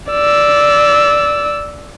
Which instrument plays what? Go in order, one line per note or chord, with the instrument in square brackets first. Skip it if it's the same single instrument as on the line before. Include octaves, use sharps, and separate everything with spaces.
[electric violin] D5 E6